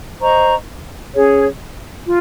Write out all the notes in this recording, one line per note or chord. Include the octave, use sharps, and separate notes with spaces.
C5 D#5 A#5 C#6
C#4 G#4 C#5
F4